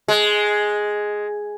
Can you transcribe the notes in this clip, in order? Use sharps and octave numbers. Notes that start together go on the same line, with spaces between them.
G#3